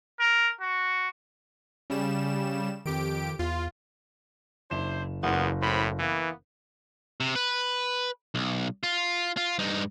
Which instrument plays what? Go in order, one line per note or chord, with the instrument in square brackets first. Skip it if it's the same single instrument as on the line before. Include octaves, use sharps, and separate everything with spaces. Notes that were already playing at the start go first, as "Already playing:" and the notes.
[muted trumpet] A#4
F#4
[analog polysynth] C#3 G3 E7 [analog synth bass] C#4
[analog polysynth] F2 G4 D7 [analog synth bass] D#3
[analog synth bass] E2 [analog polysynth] F4
[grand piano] F#1 E7 [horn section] D4 E4 C5
[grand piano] F#1 [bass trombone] E2 [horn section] A#3 B3 F4
[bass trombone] A2 [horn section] C5 B5
[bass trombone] E3 [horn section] A#3 B3
[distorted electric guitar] C3
B4
B1
F4
F4
G2 D#4